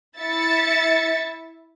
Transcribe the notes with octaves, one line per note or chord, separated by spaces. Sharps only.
E4 E5 A6 C#7